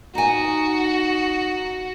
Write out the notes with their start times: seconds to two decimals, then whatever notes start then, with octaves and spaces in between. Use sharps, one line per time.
0.15 D#4 F#4 G#5